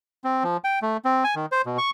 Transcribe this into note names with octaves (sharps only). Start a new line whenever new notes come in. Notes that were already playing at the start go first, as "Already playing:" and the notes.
C4
F3
G5
A3
C4
G#5
D#3
C5
B2
C#6